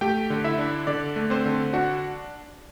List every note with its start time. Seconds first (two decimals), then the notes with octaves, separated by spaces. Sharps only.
0.01 A3 G4 G5
0.30 D3
0.44 E4 E5
0.58 D4
0.87 D3 D4 D5
1.16 A3
1.30 C4 C5
1.45 D3
1.73 D4 F#4 F#5